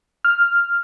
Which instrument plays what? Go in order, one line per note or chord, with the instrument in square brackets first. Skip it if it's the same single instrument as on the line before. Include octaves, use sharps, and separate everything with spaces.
[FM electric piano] F6